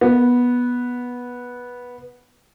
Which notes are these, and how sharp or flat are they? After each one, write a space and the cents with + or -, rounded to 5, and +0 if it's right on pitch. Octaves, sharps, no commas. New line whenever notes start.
B3 -10